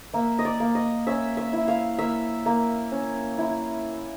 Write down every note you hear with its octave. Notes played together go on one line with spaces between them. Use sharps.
A#3 E5
D#5
D5
A#3
D#5
C#4 E5
E5
E4
F5
A#3 E5
A#3
C#4
E4